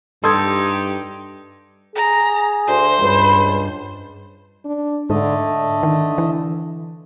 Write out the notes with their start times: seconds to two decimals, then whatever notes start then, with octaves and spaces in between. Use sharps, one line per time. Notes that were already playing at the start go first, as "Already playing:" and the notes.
0.24 G2 D#4 G4 A4 C6 D#6 G#6
1.96 G#4 A#5
2.67 D2 C5
3.01 C#2 G2 B4
4.65 D4
5.10 G#2 D3 A3 D#5 A5
5.47 D3
5.83 D#3
6.18 E3